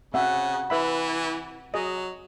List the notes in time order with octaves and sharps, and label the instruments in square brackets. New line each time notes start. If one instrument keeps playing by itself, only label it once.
[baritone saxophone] C#3 [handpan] C4 F#5 [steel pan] E5
[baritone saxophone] E3 [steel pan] B4 E5 B5
[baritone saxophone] F#3 [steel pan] G#4 D#5